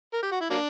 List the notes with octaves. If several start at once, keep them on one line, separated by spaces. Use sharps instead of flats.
A#4
G4
F#4
E4
F#3 A#3 D4